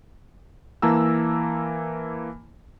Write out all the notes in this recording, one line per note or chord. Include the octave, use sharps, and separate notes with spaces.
E3 A#3 A5 A#5 E6